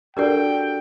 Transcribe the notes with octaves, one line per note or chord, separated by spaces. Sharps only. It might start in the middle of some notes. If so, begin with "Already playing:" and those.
D4 F#4 G4 A4 A#4 D5 G5